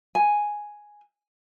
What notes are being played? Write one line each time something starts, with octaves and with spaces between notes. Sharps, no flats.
G#5